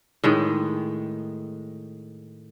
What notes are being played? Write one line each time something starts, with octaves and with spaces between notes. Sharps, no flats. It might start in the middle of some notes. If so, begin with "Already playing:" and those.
A2 D#3 G#3